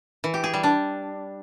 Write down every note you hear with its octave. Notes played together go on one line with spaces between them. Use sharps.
E3
G4
G#4
G3
D4